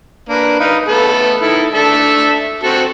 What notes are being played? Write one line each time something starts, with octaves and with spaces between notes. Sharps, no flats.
A#3 D4 B4
D#4 B4 F5
A3 B3 A4
D#3 E4 A4
D4 A4 E5
C4 F#4 A4